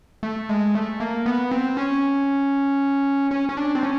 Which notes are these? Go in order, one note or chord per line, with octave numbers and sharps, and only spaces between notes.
A3
G#3
A3
A#3
B3
C4
C#4
C#4
C#4
D4
C4
C#4